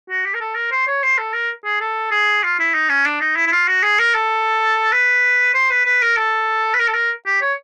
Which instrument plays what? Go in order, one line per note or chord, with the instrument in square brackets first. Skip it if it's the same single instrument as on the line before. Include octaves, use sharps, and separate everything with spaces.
[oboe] F#4
G4
A#4
A4
A#4
C5
C#5
C5
A4
A#4
G#4
A4
G#4
F4
E4
D#4
C#4
D4
D#4
E4
E4
F4
F#4
G#4
A#4
A4
B4
C5
B4
B4
A#4
A4
B4
A#4
A4
A#4
G4
C#5